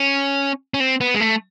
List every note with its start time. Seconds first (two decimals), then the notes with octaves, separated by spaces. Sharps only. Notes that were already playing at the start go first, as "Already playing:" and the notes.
Already playing: C#4
0.74 C#4
0.80 C4
1.01 B3
1.14 G#3
1.20 A3